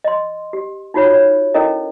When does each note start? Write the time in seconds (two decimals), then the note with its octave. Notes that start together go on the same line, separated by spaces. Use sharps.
0.04 D#5 C6
0.53 G4
0.94 D#4 F4 F#4 C#5 B5
1.13 C#5
1.54 C#4 E4 A4 A#4 D#5